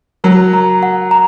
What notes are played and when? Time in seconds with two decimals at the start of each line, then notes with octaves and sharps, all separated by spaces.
0.24 F#3 A#4
0.53 A#5
0.83 F#5
1.11 A#5